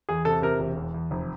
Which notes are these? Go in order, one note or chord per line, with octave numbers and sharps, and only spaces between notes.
E2 G#4
C3 A4
C3 A#4
E1
E2
E2
F1